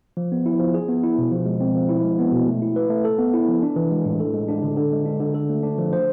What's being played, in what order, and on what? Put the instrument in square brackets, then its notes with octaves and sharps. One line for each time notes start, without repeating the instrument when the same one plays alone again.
[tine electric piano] F3
B3
E4
F3
G#4
B3
E4
B2
F3
G#3
C4
F3
E4
G#3
B3
B2
A3
E4
B4
A3
A4
B3
E4
F3
D4
E3
G#3
A2
A4
G#3
D4
D3
D3
G#3
D4
D3
A4
A3
D4
F3
C5